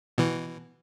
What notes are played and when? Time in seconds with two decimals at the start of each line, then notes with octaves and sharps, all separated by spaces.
0.18 B2 E3